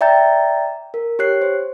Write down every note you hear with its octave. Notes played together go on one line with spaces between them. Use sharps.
D5 E5 G5 A#5 G6 A6
A#4
G4 C#5 F#6 C7
C5